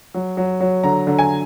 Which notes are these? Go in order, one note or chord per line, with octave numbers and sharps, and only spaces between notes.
F#3
F#3
F#3
D3 A#5
D3
G#5